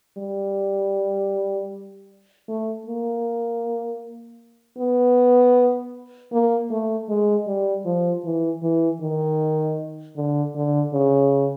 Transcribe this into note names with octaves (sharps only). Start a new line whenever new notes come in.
G3
A3
A#3
B3
A#3
A3
G#3
G3
F3
E3
E3
D#3
D3
D3
C#3